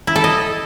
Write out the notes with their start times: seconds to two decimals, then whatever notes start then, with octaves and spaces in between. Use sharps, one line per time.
0.07 E4
0.16 A4
0.24 D#5